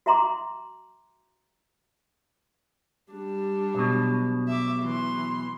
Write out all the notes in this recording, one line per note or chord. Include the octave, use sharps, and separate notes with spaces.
F#4 E5 A#5 C6 D6
G3 D4
B1 B2
E5 D6
E3 C6